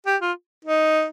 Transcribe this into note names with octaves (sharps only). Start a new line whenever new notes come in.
G4
F4
D#4